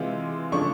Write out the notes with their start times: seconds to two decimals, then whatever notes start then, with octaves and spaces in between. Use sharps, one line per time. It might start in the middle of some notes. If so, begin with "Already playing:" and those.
Already playing: C3 E3 G#3 C4 F4
0.52 C#3 F3 A3 D4 C#6